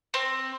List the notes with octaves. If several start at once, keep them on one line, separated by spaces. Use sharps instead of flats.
C4